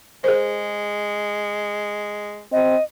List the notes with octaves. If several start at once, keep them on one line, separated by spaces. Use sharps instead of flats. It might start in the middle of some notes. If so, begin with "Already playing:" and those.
G#3 G#4 A#4 C5
C4 D#5